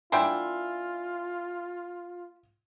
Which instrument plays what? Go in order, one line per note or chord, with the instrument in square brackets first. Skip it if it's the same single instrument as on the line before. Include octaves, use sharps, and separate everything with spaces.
[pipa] A#3 D4 E4 [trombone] F4 [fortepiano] G5 C6 [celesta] G#5